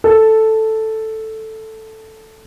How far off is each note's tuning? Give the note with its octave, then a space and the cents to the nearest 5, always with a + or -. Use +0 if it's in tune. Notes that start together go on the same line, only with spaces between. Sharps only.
A4 +0